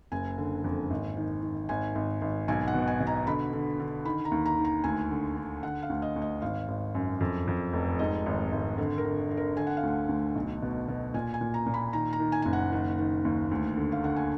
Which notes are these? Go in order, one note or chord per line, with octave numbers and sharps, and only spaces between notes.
F#1 G#5
D3
F2
G#1
D#3
D#3
G#1 G#5
G#1
G#1
B1 G#5
F#5
B2
G#5
B2
A#5
D3 B5
D3
D3
D#3 B5
A#5
D#2
A#5
D#3
A#5
D2 G#5
D3
D3
D3 F#5
F5
D2
D#5
D2
D#5
G#1 F5
G#1
F#2
F2
F2
F1
G#2 D#5
G#1
G#1
D3
A#4
D3
D3
A#4
D3 G#5
F#5
F5
D2 F#5
D2
B1
B2
B2
A#2 G#5
G#5
A#2
A#5
A#2
B5
D#3 A#5
A#5
D#3
G#5
F#1 G#5
F#5
D#3
D#3
D#2
D2
D3
F5
D3 F#5
G#5